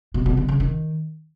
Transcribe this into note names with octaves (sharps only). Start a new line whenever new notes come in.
B2
B2
D3
C#3
D#3